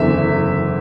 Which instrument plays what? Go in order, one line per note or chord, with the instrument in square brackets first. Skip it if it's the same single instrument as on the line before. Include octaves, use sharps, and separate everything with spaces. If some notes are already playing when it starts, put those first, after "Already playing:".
Already playing: [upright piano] F#1 E2 D3 [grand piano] E5